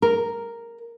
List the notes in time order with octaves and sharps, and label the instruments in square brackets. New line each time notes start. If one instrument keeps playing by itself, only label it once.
[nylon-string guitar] A#4